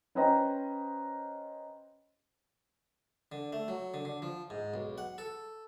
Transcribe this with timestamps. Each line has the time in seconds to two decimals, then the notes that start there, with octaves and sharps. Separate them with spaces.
0.15 C#4 B4 C5 D#5 G5 A#5
3.32 D3
3.53 A3
3.68 F#3
3.94 D3
4.05 D3
4.22 F3
4.50 G#2
4.74 B1
4.98 F#5
5.18 A4